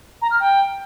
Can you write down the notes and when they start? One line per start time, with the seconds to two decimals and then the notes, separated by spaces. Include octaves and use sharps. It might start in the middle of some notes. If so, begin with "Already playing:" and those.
0.22 A#5
0.31 F6
0.40 G5